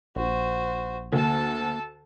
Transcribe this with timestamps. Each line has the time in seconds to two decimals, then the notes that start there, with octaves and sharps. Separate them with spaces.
0.16 A#1 F#4 C5
1.13 D2 A#3 A4 A5